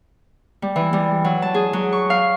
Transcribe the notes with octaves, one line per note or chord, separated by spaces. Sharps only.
G3
E3
G3
F#3
A5
G#4
F#3
C#6
F5